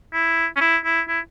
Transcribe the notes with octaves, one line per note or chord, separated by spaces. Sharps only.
E4
C#4
E4
E4
E4